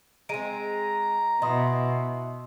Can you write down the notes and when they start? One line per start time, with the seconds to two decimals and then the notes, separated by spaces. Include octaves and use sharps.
0.29 G#3 C4 A#5 D7 D#7
1.42 B2 E4 D#5 C6 D#6